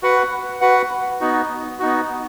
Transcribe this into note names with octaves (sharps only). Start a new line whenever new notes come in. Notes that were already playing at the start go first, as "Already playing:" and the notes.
F#4 B4 F#5
F#4 B4 F#5
B3 D#4 F#4
B3 D#4 F#4